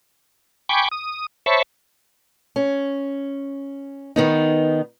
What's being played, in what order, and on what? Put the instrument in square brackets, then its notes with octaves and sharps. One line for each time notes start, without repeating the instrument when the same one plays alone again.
[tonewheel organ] G5 G#5 B5 C#6 D6
D#6
C5 C#5 E5 A5 B5 C#6
[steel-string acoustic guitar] C#4
D#3 B3 D#4